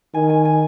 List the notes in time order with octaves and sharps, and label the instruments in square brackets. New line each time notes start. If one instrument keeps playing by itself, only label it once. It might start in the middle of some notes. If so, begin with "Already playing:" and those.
[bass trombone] D#3 [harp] G#5
[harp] G#5
G#5